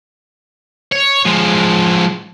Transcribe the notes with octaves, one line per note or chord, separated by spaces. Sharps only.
C#5
F3 G#3